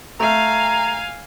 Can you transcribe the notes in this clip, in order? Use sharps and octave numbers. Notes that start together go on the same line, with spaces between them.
A3 F5 G#5 A#5